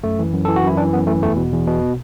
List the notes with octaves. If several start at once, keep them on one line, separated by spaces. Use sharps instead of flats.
F#2 A3
E3
F#2
E3 A4
F#4
F#2 E4
E3 D4
F#2 B3
E3 A3
E2 A3
B2
E2
B2